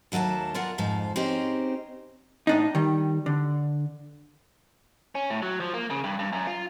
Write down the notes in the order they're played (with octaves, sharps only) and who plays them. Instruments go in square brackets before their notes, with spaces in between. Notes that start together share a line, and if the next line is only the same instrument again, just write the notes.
[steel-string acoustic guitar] D#2 F#3 A3 A#3 A5
F4 G#4 A#4 D5 F#5
F2 G#2 F3
C4 C#4 D#4 G4 G#4 C5
[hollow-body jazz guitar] A2 D4 D#4
D#3 G3
D3
[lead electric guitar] C#4
A2
F#3
F3
A#3
C#3
G2
G2
F#2
F4